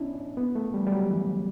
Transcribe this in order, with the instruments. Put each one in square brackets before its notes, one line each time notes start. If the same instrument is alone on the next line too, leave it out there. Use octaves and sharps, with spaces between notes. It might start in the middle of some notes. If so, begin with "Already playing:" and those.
Already playing: [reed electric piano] B3 C#4 D4 E4
B3
A3
G3
G3
F#3
E3